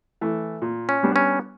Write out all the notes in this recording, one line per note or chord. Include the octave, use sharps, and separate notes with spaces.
E3 A3
A#2
C#4
G3 B3 D4
C#4